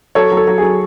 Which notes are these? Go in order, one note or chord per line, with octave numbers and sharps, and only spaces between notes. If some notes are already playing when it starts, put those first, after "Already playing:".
F#3 A4 C#5
F#3
A4
F#3
F#3 G#4